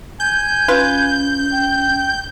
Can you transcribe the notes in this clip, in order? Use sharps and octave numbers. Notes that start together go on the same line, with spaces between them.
G#5 G6
C#4 F4 B4
G5